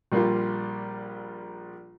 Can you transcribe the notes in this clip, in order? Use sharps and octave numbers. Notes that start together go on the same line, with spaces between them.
A#1 G3 A#3 F4